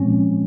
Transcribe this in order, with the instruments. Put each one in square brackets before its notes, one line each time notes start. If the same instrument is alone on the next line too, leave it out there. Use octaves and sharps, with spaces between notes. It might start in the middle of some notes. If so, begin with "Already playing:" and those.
Already playing: [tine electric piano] A#2 F3 G#3 C4 C#4